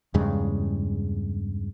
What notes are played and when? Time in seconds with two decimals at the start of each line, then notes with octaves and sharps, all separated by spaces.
0.14 E2 G2 C#3 G#3